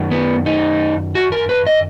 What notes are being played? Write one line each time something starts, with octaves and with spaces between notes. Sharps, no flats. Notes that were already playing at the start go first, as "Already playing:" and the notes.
Already playing: F#2 D#3
B3
D#4
F#4
A#4
B4
D#5